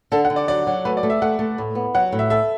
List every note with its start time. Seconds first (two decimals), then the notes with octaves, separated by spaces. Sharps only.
0.12 D3 A4
0.25 F#5
0.30 D3
0.36 D5
0.48 F#3 D5
0.67 F#3
0.85 A3 B4
0.97 D5
1.03 A3
1.10 E5
1.22 A3 F#5
1.39 A3
1.58 A2
1.75 B3
1.95 F#3 F#5
2.12 A2
2.19 E5
2.30 A4 E5